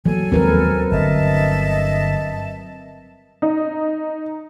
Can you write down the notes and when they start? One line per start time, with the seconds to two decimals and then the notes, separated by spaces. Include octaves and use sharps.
0.06 E3 F#3 G3 A#3 A4 G#5
0.32 D#2 F3 G#3 C4 A#4 B4
0.91 G1 D3 D#5 E5 A5
3.42 D#4